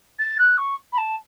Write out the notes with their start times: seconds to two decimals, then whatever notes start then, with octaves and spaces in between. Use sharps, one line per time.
0.19 A6
0.38 F#6
0.57 C#6
0.92 B5
0.97 A5